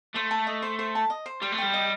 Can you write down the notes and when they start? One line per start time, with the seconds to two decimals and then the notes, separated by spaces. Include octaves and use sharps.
0.15 A3 C5
0.31 A5
0.47 D#5
0.62 C5
0.79 C5
0.95 A5
1.10 D#5
1.26 C5
1.42 G3 C6
1.52 A3
1.58 G3 G5
1.74 D#5